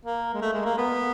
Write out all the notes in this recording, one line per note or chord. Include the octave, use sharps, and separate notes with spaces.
A#3
G#3
A3
G#3
A#3
B3